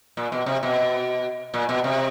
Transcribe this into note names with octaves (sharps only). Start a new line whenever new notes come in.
A#2
B2
C3
B2
A#2
B2
C3